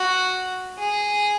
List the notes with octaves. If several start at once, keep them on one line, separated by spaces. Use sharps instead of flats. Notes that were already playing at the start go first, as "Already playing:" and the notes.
Already playing: F#4
G#4